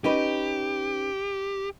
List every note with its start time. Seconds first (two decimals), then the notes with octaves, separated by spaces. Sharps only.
0.04 C#4 D#4 G4 B4